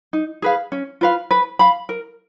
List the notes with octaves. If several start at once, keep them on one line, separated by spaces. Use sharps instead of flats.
D#4
G#4 B4 F5
C#4
F4 B4 F5
B4
F5 B5
A#4